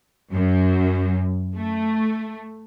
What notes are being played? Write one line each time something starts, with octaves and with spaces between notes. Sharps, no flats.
F#2
A3